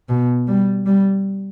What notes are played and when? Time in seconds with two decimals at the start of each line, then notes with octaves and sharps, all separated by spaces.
0.09 B2
0.48 G3
0.86 G3